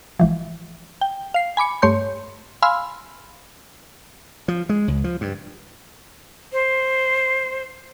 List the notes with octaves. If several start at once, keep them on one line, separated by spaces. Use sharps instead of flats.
G#1 E3 F3
G5
F5 C7
G#5 B5 D6 C#7
G2 A3 C#5 C6 G6
F5 G#5 B5 C6 E6 F6
F3
G#3
C#2
F3
G2
C5